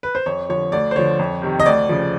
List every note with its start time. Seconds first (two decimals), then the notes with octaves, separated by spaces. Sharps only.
0.03 B4
0.15 C5
0.26 F2 C#5
0.49 D3 F3 C#5
0.72 D2 D5
0.91 C5
0.96 D3 F3 C#5
1.19 F2
1.42 C3 D#3
1.60 D#5
1.66 D2 D5
1.89 C#3 F3